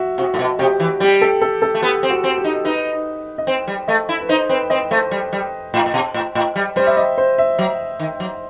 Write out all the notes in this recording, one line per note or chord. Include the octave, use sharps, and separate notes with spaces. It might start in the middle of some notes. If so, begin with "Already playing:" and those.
Already playing: F#4 E5
C3 F#4
A2
B2
C3 G4
E3
G3 G4
A4
A4
A4
A3
B3 G4
C4
F#4
C4
G4
D#4
D#4 B4
D#5
C4 C5
G3
A3 D#5
E4
B4
D#4 C5
C4 B4
C4 D#5
A3 C5
G3
G3
A2
A2
B2
A2
A2
G3
G3 C5
E5
D#5
C5
E5
F#3
D#3
F#3